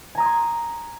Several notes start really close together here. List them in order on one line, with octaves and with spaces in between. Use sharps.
G#5 A#5 D#6 G#6 C6